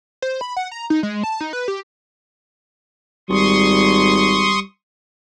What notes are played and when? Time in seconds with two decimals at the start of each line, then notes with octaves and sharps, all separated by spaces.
0.22 C5
0.41 B5
0.57 F#5
0.71 A#5
0.90 D#4
1.03 G#3
1.24 A5
1.41 D#4
1.53 B4
1.68 G4
3.30 G#1 G3 C6 C#6 D#6